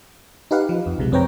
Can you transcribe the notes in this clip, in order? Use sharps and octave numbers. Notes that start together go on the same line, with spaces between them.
D#4 G4 B4 F5 F#5
F3
F2
B1 C3 G#3
F2 C4 B4 C#5 G5 A#5